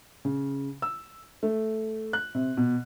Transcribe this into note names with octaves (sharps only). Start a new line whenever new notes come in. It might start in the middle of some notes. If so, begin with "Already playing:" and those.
C#3
E6
A3
F#6
C3
B2